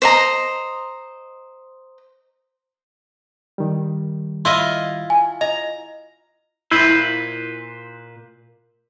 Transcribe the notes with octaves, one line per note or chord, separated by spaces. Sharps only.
C5 D#5 A#5
D#3 G3
E4 F4 D#5 C6
G#5
D#5 A#5
A#2 E4 B4 C5